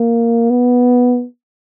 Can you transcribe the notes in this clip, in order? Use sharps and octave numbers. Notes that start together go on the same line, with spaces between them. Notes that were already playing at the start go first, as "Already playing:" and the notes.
Already playing: A#3
B3